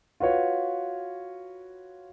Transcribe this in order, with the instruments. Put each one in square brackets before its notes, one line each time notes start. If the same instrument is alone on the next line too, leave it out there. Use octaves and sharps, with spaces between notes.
[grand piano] F4 F#4 B4 C#5